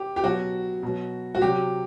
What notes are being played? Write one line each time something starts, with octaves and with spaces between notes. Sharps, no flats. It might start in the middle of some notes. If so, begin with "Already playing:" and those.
Already playing: G4
G4
B2 F#3 F#4
B2 F#3
F#4
C3 F#3 G4